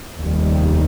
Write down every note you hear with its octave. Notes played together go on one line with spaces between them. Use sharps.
F1 D#2 D#3 G3